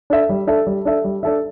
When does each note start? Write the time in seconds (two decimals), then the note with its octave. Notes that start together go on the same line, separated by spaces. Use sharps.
0.10 D4 A4 E5
0.29 G3
0.47 D4 A4 E5
0.67 G3
0.85 D4 A4 E5
1.04 G3
1.23 D4 A4 E5